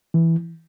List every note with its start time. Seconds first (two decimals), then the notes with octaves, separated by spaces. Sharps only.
0.14 E3